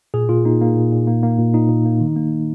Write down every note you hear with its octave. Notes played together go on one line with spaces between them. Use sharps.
A#2 G#4
A#2 F4
A#3 D#4
A#3
A#2
A#2
A#3
A#3
A#2
A#2 D#4
A#2
A#3
D#3
A#3